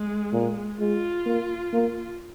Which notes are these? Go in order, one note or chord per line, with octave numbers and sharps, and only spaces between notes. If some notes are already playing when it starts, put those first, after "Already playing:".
Already playing: G#3
A#2
G#3 F4
A#3
A#3